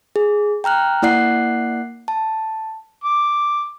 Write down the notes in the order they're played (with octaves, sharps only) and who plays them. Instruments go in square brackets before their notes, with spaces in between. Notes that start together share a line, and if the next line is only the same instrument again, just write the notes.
[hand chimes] G#4
G5 A#5 F6 F#6
A#3 E4 D5 F#5 F#6 C7
A5
[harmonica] D6